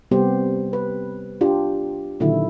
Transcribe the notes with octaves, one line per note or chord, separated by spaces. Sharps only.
C3 G3 B3 C4 G4 C5
B4
D4 F4 G4
A#2 D3 D#3 F#3 E4